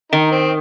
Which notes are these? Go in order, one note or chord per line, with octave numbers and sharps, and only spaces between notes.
D#3 D#4
C4